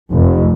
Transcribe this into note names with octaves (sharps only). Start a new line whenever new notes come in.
F1